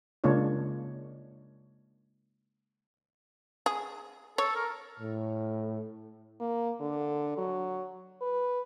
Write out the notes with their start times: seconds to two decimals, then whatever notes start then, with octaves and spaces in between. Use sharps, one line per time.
0.24 C#3 G#3 A#3 D4 F4 C#5
3.66 G#4
4.38 A4 C#5
4.55 A#4
5.00 A2
6.40 A#3
6.80 D3
7.38 F#3
8.21 B4